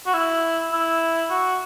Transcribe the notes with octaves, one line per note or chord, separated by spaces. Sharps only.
F#4
E4
E4
F#4